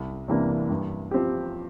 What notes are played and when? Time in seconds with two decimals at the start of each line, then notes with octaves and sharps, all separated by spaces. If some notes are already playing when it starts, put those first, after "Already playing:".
Already playing: C2
0.28 C3 E3 A#3 D4
0.70 G2
1.11 F3 C4 G4